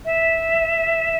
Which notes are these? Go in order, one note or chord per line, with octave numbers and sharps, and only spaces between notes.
E5